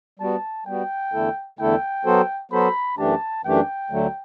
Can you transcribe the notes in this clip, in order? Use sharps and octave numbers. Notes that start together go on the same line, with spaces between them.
G3 B3 F#4 A5
G3 B3 F#4 G5
E2 D3 A3 E4 A4
E2 D3 A3 E4 A4 G5
F#3 B3 F#4 A4 C5
F#3 B3 F#4 A4 C5 B5
F#2 E3 A3 D4 G4 A5
F#2 E3 A3 D4 G4 G5
D2 D3 F#3 A3